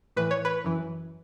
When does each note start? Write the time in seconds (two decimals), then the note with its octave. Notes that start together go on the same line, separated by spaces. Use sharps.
0.16 A2 E3 B4
0.31 C#5
0.45 B4
0.65 F#2 E3